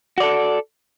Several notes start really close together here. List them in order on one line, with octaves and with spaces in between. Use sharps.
F#4 D5 A4